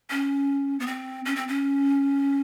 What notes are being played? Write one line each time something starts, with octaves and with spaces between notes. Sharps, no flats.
C#4
B3
C4
C#4
C4
C#4